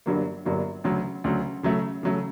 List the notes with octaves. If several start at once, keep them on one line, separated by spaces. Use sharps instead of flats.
G1 G2 D3 F#3 A#3
G1 G2 D3 F#3 A#3
D2 C#3 F#3
D2 C#3 F#3
C#3 F#3 A3
C#3 F#3 A3